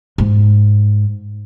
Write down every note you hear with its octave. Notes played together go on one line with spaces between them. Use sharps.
G#2